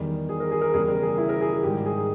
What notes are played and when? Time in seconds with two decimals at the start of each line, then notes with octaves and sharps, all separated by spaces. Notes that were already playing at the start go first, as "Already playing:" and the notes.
Already playing: E2 D#3 G3
0.29 G#4
0.40 A#4
0.51 G#4
0.61 A#4
0.73 E2 C#3 G3 G#4
0.88 A#4
1.03 G#4
1.18 E4
1.29 A#4
1.41 G#4
1.52 G#4
1.63 G#2 D#3 G3 G4
1.86 G#4